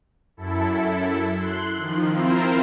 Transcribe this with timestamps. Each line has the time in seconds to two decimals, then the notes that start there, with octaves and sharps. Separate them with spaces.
0.37 F#2 E4 A4
1.37 C6 F#6
1.76 D#3 F3
2.10 C4 E4 F4 A#4 C5